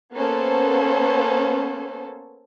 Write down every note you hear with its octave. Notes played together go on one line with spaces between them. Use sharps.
A#3 B3 C#4 A4 C5